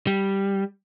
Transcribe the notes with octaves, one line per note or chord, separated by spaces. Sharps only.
G3